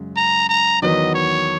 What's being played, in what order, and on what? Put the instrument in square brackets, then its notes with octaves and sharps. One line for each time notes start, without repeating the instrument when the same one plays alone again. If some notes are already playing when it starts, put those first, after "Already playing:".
Already playing: [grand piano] F#2 C#3 G#3
[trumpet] A#5
A#5
[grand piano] E2 D#3 F#3 B3 [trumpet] D#5
[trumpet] C#5